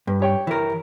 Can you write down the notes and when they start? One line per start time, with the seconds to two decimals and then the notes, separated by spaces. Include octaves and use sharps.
0.07 G2 B4
0.20 G4 C#5 G5
0.47 E3 A#4